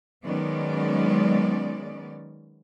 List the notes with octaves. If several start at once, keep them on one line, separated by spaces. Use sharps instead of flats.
D#3 F#3 G#3 B3 C#4 D5